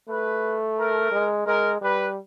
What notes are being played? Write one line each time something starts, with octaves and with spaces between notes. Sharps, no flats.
A3 B4
A#4
G#3
G#3 A#4
G3 B4